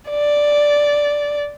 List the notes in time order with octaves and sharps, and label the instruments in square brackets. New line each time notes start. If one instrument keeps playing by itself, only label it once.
[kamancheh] D5